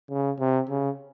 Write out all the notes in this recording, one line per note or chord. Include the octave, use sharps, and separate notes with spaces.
C#3
C3
C#3